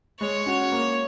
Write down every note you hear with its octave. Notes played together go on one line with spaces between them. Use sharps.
G#3 C#5
C#4 F#4
A#3